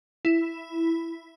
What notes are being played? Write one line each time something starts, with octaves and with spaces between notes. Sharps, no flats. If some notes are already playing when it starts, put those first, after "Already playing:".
E4